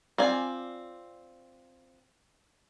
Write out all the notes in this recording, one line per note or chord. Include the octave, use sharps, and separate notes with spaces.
C4 F4 D5 G#5